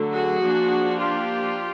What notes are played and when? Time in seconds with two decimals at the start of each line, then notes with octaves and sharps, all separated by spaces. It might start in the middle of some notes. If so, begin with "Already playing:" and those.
Already playing: D3 F#3 A3
0.12 F#4 G#4
0.41 F3 A#3 D4
0.98 F4 G4